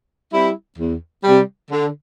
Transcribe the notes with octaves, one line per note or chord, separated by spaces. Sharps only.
G3 C4 E4
E2
C3 G3
D3